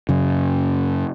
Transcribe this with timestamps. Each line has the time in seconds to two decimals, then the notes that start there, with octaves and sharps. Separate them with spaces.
0.09 F#2 C#3